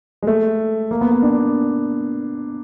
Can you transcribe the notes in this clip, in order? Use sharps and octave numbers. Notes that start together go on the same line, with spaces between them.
G#3
A3
A#3
B3
B3
D4